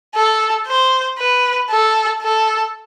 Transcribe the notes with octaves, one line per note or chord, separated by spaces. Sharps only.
A4
C5
B4
A4
A4